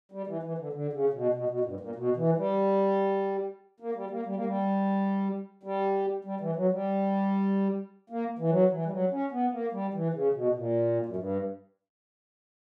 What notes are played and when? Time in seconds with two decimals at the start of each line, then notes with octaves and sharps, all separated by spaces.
0.12 G3
0.27 E3
0.43 E3
0.58 D3
0.73 D3
0.93 C#3
1.09 C#3
1.13 B2
1.34 B2
1.49 B2
1.60 A#2
1.64 G2
1.80 A#2
1.96 B2
2.16 E3
2.37 G3
3.80 A#3
3.95 G3
4.10 A#3
4.26 G3
4.36 A#3
4.45 G3
5.63 G3
6.25 G3
6.40 E3
6.56 F#3
6.71 G3
8.10 A#3
8.39 E3
8.50 F#3
8.70 E3
8.85 G3
8.91 F#3
9.11 C#4
9.32 B3
9.52 A#3
9.72 G3
9.94 E3
10.14 C#3
10.34 B2
10.55 A#2
11.06 F#2
11.16 G2